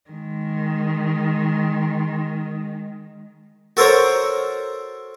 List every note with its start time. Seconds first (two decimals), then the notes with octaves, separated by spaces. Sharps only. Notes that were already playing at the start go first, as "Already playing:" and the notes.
0.10 D#3 G#3
3.77 F#4 A4 A#4 C5 C#5 A#5